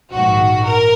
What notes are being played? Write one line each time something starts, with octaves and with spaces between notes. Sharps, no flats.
A#1 G#2 D#3 F#4
A#4